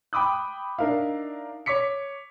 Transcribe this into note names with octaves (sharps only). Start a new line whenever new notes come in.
G5 B5 D6 D#6 F#6
D4 D#4 A#4 E5 F5
C#5 C#6 D6 B6 C#7